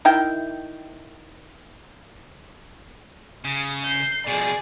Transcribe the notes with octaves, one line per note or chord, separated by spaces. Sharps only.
D#3 E4 G5
C#3
G6 C7
B2 F3 G#4 D5